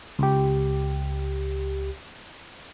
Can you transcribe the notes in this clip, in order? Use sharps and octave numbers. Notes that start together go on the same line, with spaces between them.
C#2 G4